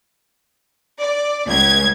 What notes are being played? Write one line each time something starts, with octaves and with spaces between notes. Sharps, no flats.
D5
C#2 G#6